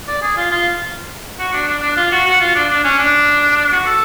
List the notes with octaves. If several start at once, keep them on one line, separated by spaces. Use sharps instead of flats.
D5
G#4
F4
F4
F#4
D4
D4
D4
F4
F#4
F#4
F4
D4
D4
C#4
D4
F#4
A4